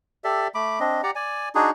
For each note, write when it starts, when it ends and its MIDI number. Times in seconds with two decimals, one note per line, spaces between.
0.24 0.48 67
0.24 0.48 69
0.24 0.48 74
0.24 0.48 76
0.55 0.79 57
0.55 0.79 83
0.55 0.79 86
0.80 1.02 60
0.80 1.02 62
0.80 1.02 75
1.03 1.11 67
1.03 1.11 74
1.03 1.11 78
1.03 1.11 82
1.15 1.49 74
1.15 1.49 80
1.55 1.71 62
1.55 1.71 63
1.55 1.71 66
1.55 1.71 68